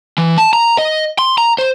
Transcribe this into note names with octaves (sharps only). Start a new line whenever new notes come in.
E3
A5
A#5
D#5
C6
A#5
C5